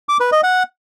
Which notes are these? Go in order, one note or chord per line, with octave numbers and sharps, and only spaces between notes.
D6
B4
D#5
F#5